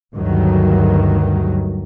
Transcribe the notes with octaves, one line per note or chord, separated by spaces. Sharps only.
D2 G2 D#3 F#3